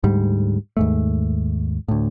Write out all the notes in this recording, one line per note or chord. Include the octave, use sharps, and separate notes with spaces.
D2 G#2 G3
D#2 G#2 A3
D2 A2